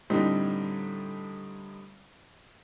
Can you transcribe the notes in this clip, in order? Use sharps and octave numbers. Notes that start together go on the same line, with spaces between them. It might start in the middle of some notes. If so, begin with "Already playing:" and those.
A2 D3 G3 C4 D#4